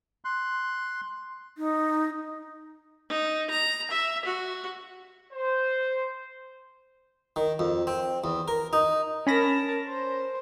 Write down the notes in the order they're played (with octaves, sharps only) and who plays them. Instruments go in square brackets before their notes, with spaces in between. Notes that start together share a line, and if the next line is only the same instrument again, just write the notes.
[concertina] C6 F#6
[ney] D#4
[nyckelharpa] D#4
A#5
E5
F#4
[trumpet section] C5
[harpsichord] D#3
F2
C4
E2
A#4
D#4
[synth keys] C#4 B5 A#6 [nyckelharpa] A#4 A5
[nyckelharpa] C5